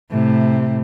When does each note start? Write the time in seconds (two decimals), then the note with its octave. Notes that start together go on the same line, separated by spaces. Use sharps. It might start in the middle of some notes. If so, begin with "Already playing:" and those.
0.11 A2 C3